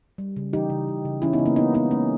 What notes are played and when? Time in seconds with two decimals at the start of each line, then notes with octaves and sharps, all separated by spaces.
0.18 G3
0.36 C#3
0.53 E3 D#4 G4
0.70 C#3
0.88 C#3
1.05 C#3
1.22 E3 C#4 E4
1.33 B3 D#4
1.39 C#3
1.46 A#3 C#4
1.56 G#3 B3 D#4
1.74 G#3 B3 D#4
1.91 G#3 A#3 C#4